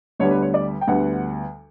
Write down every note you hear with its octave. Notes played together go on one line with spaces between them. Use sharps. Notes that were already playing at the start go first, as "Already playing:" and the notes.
D2 D3 G3 B3 C#5
B4
C#5
D5
G5
D2 D3 G3 B3 F#5